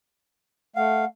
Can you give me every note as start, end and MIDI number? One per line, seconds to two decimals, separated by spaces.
0.76 1.05 57
0.76 1.05 77
0.76 1.07 78